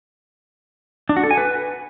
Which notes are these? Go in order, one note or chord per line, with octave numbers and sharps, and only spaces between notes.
D4
F#4
A4
G#5
B4